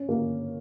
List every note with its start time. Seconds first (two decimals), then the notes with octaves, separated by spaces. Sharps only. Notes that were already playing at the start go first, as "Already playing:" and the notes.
Already playing: C#4
0.09 A#3